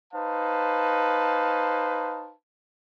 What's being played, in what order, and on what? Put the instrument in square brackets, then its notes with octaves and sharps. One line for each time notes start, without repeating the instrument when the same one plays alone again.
[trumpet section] D#4 B4 C5 F5 A5